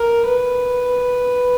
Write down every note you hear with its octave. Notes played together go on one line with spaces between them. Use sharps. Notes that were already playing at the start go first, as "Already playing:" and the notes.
Already playing: A#4
B4